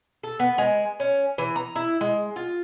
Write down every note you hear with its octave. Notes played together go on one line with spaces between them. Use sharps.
A4
B3
G#3
C#4
E3
A#5
E4
G#3
F4